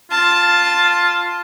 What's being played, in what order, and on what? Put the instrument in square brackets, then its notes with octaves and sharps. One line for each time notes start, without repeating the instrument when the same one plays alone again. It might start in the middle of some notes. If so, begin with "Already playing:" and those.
[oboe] F4 [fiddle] A5